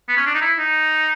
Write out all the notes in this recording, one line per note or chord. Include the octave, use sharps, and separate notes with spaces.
B3
C#4
D4
D#4
E4
D#4